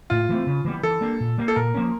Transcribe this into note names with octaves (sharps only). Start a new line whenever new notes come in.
A2 F4
E3 A3 C4
C#3
E3 G3 B3
E3 A4
G3 A#3 D4
A#2
G3 A#3
A4
A#2 A#4
F3 A#3 C#4